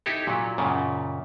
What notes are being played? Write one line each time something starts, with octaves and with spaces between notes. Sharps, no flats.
D#4 E4 G4 A4
A#2 F#3
F#2 A#2 C#3